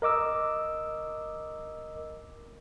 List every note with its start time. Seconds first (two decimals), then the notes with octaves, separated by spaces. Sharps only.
0.02 A#4 D#5 D6 E6